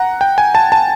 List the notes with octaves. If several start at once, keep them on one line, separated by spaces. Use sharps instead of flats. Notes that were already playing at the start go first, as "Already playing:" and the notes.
Already playing: F#5 A#5
G5
G#5
A5
A5